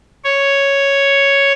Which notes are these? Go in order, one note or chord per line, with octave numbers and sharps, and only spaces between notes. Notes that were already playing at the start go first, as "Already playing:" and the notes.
C#5